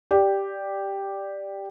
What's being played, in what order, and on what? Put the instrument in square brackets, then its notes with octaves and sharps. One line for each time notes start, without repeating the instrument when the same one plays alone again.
[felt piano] G4 D5